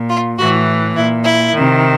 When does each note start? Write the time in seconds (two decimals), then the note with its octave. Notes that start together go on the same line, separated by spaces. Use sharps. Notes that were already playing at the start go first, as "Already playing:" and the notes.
Already playing: A#2
0.09 F4
0.39 A2 E3 F#4
0.96 A#2 E4
1.24 E4
1.53 C3 D#3